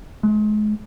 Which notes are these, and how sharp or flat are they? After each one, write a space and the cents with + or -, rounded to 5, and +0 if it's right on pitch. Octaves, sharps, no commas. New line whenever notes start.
G#3 +35